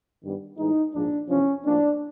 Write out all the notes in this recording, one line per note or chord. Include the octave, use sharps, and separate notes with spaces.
G2 D#3 G3 B3
A2 E3 G#3 D#4
A#1 G#2 F3 G#3 D4
E2 C3 F3 C#4
A2 F3 A#3 D4